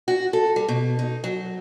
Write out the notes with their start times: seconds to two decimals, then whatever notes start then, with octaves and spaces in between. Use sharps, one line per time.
0.08 F#4
0.33 A4
0.56 G3
0.68 B2
0.99 D#4
1.24 F#3